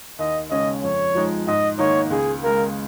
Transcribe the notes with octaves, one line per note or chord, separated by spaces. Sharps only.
D#2 D#5
C#3 G#3 C#4 D#5
F2 C#5
F3 G#3 D#4
G#2 D#5
D#3 A#3 D#4 C#5
C#2 G#4
C#3 G#3 A#4